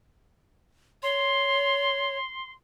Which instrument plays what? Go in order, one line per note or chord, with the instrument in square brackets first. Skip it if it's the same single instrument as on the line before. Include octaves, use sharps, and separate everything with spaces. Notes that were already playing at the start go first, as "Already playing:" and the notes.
[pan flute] C#5 [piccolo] C6